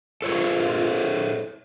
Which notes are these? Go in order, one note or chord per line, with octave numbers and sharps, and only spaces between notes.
F4 A4 C5 C#5